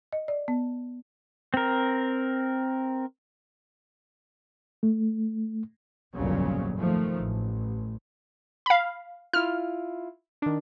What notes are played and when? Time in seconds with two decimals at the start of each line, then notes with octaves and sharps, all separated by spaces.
0.13 D#5
0.28 D5
0.48 B3
1.54 C4 A#4
4.83 A3
6.13 G1 C2 F2 A#2 C#3 F#3
6.79 D#3 F3 A3
7.18 A1
8.66 F5 B5
9.33 E4 F4 F6
10.42 D#3 D4